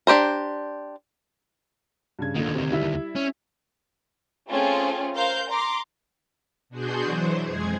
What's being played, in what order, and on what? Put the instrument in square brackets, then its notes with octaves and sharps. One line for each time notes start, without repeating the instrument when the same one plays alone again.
[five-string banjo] D4 G4 C5 A#5
[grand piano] G2 C#3 G#6
[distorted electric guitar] D2 D#3 [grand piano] A#2 D3
[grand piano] C3
G3 E4 E5
[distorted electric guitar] C#4
[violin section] A3 C4 C#4 F4 G#4
A#4 C5 F5 G6
A#5 C6 D6
[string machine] B2 D4 F#4 G#4 C6 G6
E3 F#3 C5
F2 G#3 G#4 G#6